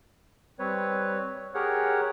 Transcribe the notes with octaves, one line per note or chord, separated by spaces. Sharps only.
G3 C4 B4 C#5
G4 G#4 A#4 C#5 F#5